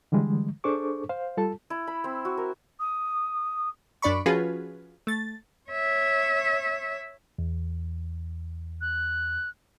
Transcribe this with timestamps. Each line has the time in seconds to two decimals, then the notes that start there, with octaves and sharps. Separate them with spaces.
0.12 D3 E3 G3 G#3
0.64 D4 G#4 A4 C5 C#6 D6
1.09 C5 F5
1.37 G3 F4 A4 A5
1.70 E4
1.87 B5
2.04 C4
2.25 F#4
2.37 A#4
2.80 D#6
4.02 F#2 D4 D5 B5 C#6
4.26 F3 C#4 F4 F#4 G#4 B4
5.07 A3 A6
5.70 C#5 E5
7.39 E2
8.81 F#6